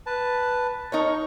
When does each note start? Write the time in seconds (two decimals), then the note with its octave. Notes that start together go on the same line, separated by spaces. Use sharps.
0.06 B4 A5
0.92 D#4 A#4 C#5 C#6